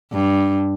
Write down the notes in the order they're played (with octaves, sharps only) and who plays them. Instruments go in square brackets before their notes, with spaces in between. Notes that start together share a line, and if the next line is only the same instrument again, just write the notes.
[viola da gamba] G2